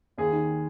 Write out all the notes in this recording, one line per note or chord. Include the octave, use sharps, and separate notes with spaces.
D#2 G#4
D#3